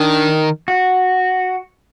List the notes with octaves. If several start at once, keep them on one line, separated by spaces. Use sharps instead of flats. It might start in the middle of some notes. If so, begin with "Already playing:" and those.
Already playing: D#3 D4
F#4